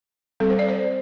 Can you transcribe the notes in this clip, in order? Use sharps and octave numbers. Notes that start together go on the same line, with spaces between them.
G3 C4 A4
C5
D5
C5